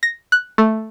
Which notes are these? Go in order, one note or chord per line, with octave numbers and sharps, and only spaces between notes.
A#6
F#6
A3